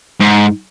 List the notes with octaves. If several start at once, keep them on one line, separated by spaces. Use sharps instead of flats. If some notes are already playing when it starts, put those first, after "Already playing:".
G#2